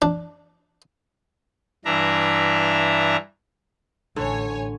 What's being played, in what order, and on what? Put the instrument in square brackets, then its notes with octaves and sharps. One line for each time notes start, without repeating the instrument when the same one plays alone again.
[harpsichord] D4
[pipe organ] G2 E3 D4 E5 A#5
[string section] A1 C#5 G#5 [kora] D3